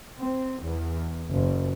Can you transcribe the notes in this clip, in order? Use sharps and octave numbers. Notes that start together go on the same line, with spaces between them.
C4
E2
F#1